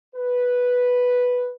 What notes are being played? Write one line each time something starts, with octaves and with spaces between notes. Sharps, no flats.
B4